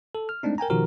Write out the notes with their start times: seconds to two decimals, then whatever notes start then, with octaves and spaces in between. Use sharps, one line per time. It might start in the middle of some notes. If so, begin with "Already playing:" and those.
0.15 A4
0.29 F6
0.43 G#3 A3 C4 D4 D#4
0.58 A#4 G5 G#5 A#5
0.70 B2 D#3 F3 F#4 G4 A#4